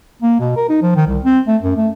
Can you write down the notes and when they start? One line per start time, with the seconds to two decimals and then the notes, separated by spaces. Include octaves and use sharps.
0.22 A#3
0.40 B2
0.56 A#4
0.69 D#4
0.82 F3
0.96 D#3
1.07 C2
1.24 C4
1.47 A3
1.62 F#2
1.76 A3